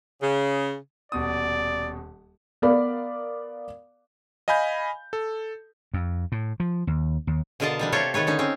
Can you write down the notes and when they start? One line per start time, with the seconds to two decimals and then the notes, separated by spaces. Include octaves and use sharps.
0.21 C#3
1.12 D#1 B2 D5 D#6
2.62 B3 A#4 D5 F5 B5
4.48 D#5 F5 G#5 B5 G6
5.13 A4
5.94 F2
6.32 A2
6.60 F3
6.87 D#2
7.27 D#2
7.60 B2 D3 F4 A#4 D#5 A5
7.79 E3 G3 D4
7.92 C3 F4 G4 A4 C#5
8.14 D#3 A4 B4 C#5
8.27 D3 C#4 D#4
8.39 C4 C#4